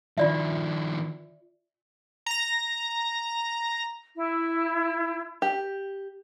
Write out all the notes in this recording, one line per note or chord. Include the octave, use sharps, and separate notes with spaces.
D#3 F3 F4 D5 E5
A#5 A#6
E4
G4